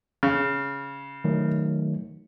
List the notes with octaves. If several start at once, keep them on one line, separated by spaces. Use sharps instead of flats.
C#3
D#3 F#3 A3